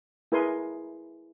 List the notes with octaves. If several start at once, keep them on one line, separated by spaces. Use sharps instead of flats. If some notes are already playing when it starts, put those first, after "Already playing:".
E4 G#4 A#4 B4 G#5 C6